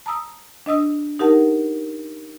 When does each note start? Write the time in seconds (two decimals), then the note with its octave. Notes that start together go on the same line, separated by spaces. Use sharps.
0.06 A5 A#5 D#6 E6
0.66 D4 D#5 D#6 E6
1.19 D#4 G4 A#4 F#5 A5